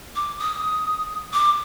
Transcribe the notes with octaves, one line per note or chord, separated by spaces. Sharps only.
D6
D#6
D6